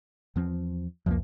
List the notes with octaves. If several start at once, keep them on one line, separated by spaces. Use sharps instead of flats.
E2 F3 C4
C2 F2 F3 G#3 A#3